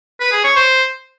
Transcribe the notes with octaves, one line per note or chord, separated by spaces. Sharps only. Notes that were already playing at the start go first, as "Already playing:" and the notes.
B4
G#4
C#5
C5